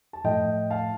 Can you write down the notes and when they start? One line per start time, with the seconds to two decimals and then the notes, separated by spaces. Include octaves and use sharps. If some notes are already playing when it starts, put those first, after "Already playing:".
0.13 A5
0.24 A2 F3 A3 D#5 G5
0.70 F5 A5